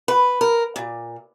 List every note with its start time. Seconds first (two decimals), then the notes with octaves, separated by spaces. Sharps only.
0.08 B4
0.41 A#4
0.76 A#2